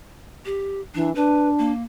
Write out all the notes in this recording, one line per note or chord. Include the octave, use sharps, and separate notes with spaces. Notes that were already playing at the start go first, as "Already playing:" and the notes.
G4
E3 D4
D4 B4
A#3